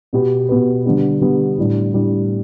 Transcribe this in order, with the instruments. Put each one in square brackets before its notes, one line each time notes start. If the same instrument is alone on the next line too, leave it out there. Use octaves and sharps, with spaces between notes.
[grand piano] B2 B3 G4 B4
B2 B3 G4 B4
D3 G3 B3 G4
D3 G3 B3 G4
A2 G3 D4
A2 G3 D4